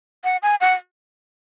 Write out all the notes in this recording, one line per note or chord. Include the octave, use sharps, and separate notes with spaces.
F#5
G#5
F#5